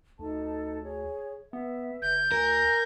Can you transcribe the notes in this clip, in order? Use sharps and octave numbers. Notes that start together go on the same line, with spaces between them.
D2 D#4 A4 A5
G#4 C#5
B3 B4 E5
G1 G6
D2 A#4 G#5 A#5